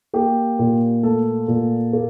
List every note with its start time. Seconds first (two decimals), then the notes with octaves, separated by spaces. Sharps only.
0.14 A#3 G4
0.59 A#2
1.03 A3 A4
1.48 A#2
1.93 A#3